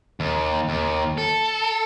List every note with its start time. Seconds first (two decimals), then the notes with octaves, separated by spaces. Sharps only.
0.20 D#2
0.69 D#2
1.18 A4